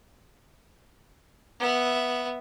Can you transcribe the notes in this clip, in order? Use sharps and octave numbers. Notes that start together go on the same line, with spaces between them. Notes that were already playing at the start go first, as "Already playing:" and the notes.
B3 E5